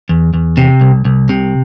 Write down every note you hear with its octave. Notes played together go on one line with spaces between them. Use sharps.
E2
E2
C3
C2
C2
C3